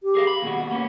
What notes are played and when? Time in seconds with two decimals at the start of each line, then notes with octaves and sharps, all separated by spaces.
0.03 G4
0.15 G#4 A#4 F5
0.27 B5
0.42 D#2 B2 F#4
0.55 F#5
0.71 A#3 B3 C#4